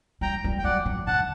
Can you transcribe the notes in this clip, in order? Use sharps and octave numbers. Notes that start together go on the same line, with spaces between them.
G3 G5 A#5
G3
G5
F#3 D5 F#5
F#3
D3 F#5 A5